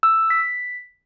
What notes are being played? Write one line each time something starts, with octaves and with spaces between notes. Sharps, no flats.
E6
B6